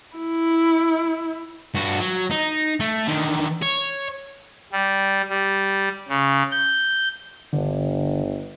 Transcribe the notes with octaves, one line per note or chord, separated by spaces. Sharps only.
E4
G2 F#4
F#3
D#4
A3
D3 D#3
C#5
G3
G3
C#3
G6
G1 D3